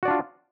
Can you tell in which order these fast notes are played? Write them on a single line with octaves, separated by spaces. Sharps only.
F#4 D5 D4 F4